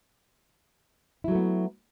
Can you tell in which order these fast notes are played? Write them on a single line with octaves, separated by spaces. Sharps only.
E4 F#3 A3 B3